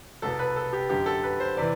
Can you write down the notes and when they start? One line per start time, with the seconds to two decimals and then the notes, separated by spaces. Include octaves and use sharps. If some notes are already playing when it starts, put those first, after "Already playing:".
0.22 C2 B2 A4
0.39 B4
0.56 A4
0.73 G4
0.90 F#2 D3 G4
1.06 A4
1.23 B4
1.40 C5
1.57 C3 E3 D5